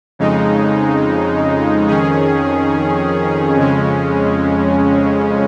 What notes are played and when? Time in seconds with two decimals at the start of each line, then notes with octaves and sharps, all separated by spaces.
0.19 F2 C#3 G#3 D#4
1.87 F2 D#3 C#4 G#4
3.57 F2 C#3 G#3 C#4